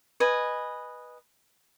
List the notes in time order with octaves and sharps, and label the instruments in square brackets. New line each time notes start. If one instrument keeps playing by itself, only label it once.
[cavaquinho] B4 D#5 G#5